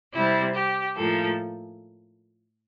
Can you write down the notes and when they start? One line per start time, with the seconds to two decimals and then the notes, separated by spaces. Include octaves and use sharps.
0.13 C3 G3 C4 E4
0.54 G4
0.95 A2 F3 A#3 A4